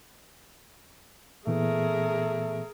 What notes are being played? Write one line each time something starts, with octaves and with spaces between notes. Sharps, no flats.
A#2 E3 A3 B3 G#4 A#4